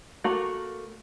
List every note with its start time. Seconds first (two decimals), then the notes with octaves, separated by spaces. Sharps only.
0.24 A3 A#3 F#4 A#4